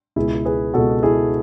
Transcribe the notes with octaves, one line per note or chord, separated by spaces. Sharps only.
C#2 B2 E4 G#4
G#4 B4
C#2 B2 F#4 A4
E4 G#4